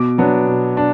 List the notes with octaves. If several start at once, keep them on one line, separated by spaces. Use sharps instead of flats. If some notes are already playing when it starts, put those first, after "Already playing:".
Already playing: B2 D6
F#3 B3 D4
B2
D4